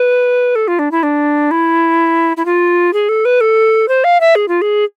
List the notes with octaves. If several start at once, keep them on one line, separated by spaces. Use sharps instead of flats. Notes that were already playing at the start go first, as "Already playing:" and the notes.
Already playing: B4
A4
F4
D4
E4
D4
E4
E4
F4
G#4
A4
B4
A4
C5
F5
E5
G#4
F4
G#4